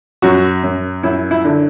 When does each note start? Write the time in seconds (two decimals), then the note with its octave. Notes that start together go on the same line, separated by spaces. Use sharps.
0.22 F#2 F#4
0.63 F#2
1.03 F#2 E4
1.31 E4
1.45 D3